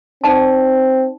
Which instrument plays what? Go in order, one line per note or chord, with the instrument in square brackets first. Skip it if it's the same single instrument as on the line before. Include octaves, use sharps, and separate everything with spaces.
[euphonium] C4 [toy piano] D#4 D5 A5